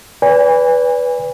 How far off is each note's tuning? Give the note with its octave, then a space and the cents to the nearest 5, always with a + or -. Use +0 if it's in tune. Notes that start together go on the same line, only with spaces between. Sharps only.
B4 +0 D5 -40 G#5 -35